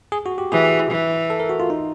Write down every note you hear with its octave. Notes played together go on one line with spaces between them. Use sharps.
G#4
F#4
G4
E3 G#4
E3
A4
A#4
F#4
F4
D#4